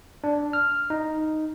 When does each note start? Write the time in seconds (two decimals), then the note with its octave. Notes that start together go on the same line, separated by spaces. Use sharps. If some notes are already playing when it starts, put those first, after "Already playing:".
0.24 D4
0.53 F6
0.90 D#4